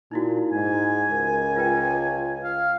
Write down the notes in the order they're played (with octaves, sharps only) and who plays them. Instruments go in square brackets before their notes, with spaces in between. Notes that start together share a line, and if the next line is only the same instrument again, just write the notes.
[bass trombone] A#2 [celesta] D#4 E4 F#4
[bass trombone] G#2 [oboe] G#5
[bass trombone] C#2 [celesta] A#4
[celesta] F4 B4 G5
[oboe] F5